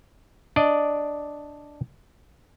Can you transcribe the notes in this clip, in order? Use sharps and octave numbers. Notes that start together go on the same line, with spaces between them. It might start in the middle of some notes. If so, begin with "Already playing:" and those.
D4 D5 D#5